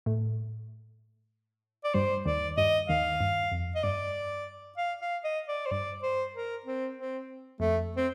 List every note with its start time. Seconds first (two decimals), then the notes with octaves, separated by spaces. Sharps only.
0.06 A2 A3
1.84 D5
1.94 G2 G3 C5
2.26 D#2 D#3 D5
2.57 G2 G3 D#5
2.89 D#2 D#3 F5
3.20 G2
3.52 F2
3.75 D#5
3.83 G2 D5
4.77 F5
5.01 F5
5.24 D#5
5.48 D5
5.66 C5
5.71 G2 D5
6.03 C5
6.35 A#4
6.66 C4
6.97 C4
7.60 F2 A3
7.97 C4